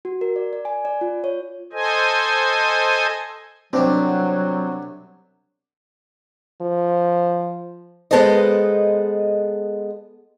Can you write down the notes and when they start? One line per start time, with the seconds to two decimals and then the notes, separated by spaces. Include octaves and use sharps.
0.05 F#4
0.21 A#4
0.36 D5
0.53 D5
0.65 G#5
0.85 D5
1.01 F4
1.24 C#5
1.73 A4 C5 D#5 G#5
3.73 C2 F#3 B3 C4 D4
6.61 F3
8.11 G#3 B3 A4 B4 C5 D#5